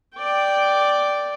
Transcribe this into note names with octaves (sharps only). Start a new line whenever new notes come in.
D5 G5